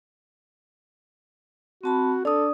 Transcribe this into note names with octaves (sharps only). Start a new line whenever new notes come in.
C4 F#4 A5 B5
D4 A4 D5 D#6